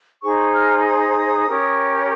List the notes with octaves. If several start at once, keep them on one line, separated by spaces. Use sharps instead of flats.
D#4 G#4 C5 C#6
F6
D#6
C#4 G4 A#4